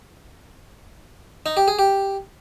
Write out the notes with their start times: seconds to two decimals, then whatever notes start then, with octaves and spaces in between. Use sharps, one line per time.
1.46 D#4
1.57 G4
1.68 G#4
1.79 G4